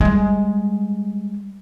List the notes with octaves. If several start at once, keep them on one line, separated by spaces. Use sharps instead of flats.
G3 G#3